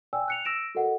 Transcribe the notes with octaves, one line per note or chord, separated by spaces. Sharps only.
D5 G5 G#5 E6
F#6 C#7 F7
E6 A#6 D7 E7
F#4 A4 A#4 D#5 F#5